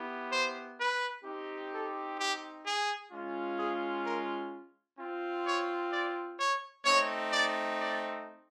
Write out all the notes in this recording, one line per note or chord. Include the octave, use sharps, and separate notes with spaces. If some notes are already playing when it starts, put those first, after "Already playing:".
Already playing: B3 E4 G4
C5
B4
C4 D#4 G4
A4
G4
G#4
G#3 C#4 F4
G#4
A#4
C4 F4
C#5
D5
C#5
A3 C4 D#4 C#5
D5
D5